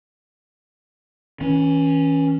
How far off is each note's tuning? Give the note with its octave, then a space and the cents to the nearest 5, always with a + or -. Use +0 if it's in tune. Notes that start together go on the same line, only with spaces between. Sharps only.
E3 -35 C#4 +0